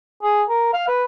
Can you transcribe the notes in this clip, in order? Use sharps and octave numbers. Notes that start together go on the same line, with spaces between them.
G#4
A#4
F5
B4